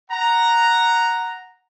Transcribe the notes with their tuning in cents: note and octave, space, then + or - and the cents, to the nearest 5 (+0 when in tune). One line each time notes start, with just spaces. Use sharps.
F#5 +0 A#5 +0